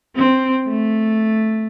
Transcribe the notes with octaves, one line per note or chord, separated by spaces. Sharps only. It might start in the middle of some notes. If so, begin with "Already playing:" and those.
C4
A3